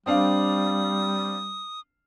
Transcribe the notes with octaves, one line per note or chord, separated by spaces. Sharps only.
G3 C4 D4 F5 D#6